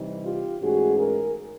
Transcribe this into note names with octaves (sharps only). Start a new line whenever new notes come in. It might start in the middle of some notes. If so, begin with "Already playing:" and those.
Already playing: C3 E3 G3 C4 D#4
F4 G4
G#2 E3 A3 C#4 F#4 G#4
G#4 A#4